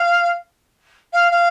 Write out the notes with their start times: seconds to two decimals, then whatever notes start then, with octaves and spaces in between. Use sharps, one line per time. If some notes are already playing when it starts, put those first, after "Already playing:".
Already playing: F5
1.13 F5
1.32 F5